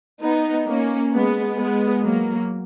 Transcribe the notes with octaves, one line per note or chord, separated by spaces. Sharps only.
B3 D#4
A#3 C#4
G#3 B3
G#3 B3
F#3 A#3